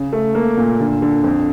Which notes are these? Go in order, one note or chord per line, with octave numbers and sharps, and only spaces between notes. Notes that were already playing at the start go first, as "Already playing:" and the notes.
Already playing: C#3
A3
A#3
A#2
D3
D3
F2